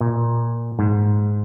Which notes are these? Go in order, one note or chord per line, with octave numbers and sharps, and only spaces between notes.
A#2
G#2